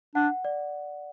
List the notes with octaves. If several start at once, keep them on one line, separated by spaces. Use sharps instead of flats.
D4 F#5
D5